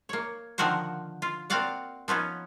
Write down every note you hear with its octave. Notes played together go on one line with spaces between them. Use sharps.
A#3 C#5
D3 D#3 F3 F#4 A#4 C5
F4
A#3 C4 F#4 D5 F5 F#5
F3 B3 C#4 D#4